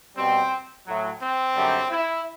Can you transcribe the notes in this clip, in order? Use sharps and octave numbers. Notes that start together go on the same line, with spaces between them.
B2 G3 C4
A2 F#3
C4
F#2 D3 G3
E4